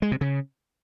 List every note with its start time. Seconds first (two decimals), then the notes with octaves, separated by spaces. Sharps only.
0.02 G#3
0.12 C3
0.21 C#3